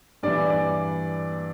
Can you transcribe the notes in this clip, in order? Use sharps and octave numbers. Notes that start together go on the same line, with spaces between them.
G2 E3 D5
D5